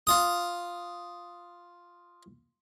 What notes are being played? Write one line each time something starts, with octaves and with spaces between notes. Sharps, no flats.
F4 D#6